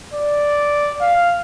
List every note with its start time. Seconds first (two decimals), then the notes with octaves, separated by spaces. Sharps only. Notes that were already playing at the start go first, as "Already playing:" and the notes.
0.13 D5
1.01 F5